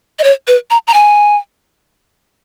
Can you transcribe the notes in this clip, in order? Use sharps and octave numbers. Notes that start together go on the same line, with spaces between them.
D#5
C#5
B4
A#5
A#5
G#5